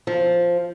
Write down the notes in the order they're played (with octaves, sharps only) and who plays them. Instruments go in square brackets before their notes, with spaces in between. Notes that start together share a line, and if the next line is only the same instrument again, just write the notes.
[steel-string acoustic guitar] F3